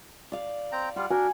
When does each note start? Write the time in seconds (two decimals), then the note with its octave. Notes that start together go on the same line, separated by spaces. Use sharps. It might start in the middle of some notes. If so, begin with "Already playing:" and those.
0.32 D5 F5
0.72 C4 G5 A#5
0.96 G3 F4 F#5
1.11 D4 F#4 A#4 G#5